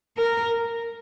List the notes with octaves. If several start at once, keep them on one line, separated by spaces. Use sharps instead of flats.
A#4